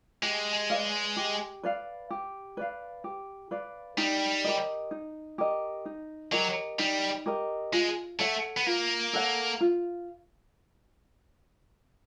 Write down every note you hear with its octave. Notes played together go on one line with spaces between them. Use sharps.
G#3 G4
B4 D5 F5
G4
B4 D5 F5
G4
B4 D5 F5
G4
B4 D5 F5
G3 D#4
G4 A#4 D#5
D#4
G4 A#4 D#5
D#4
F#3 G4 A#4 D#5
G3 D#4
G4 A#4 D#5
G#3 F4
A3 A4 C#5 F#5
B3
A#3 F4
A4 C#5 F#5
F4